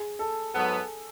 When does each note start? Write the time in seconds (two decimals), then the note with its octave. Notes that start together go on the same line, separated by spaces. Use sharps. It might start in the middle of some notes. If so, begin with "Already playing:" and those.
Already playing: G#4
0.19 A4
0.54 G#2 F#3 B3 A4